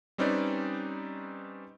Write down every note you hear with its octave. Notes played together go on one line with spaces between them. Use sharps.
G3 C4 C#4 D#4 B4 D5